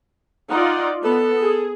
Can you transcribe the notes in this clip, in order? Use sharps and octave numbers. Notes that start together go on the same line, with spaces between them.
D#4 F4 D5 F5 F#5
B3 A4
G#4